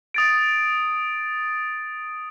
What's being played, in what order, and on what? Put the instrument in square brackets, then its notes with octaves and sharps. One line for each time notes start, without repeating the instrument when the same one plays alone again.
[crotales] D#6 A6 D7